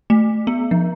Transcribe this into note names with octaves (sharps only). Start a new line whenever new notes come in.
A3
B3
F3